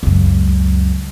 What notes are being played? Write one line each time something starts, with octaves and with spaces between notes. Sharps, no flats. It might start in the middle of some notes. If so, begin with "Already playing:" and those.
C#2 F#2